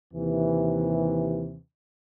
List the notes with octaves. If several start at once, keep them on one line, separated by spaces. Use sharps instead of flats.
D#2 C3 E3